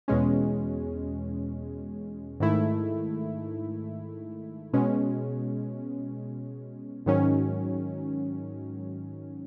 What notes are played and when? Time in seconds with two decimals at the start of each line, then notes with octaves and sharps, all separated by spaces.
0.08 E2 B2 G#3 C#4
2.40 G#2 D#3 A3 E4
4.73 B2 G#3 C#4
7.06 G#2 D#3 F#3 C#4